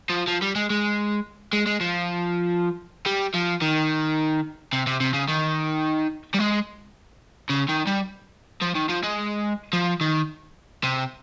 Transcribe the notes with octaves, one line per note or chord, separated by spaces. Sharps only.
F3
F3
G3
G#3
G#3
G#3
G#3
F3
G3
F3
D#3
C3
C3
C3
C#3
D#3
G3
G#3
C#3
D#3
G3
F3
D#3
F3
G#3
F3
D#3
C3